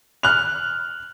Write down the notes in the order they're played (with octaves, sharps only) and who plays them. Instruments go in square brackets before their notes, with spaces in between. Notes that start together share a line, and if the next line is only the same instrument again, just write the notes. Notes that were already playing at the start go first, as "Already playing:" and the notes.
[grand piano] F6 F#6 F7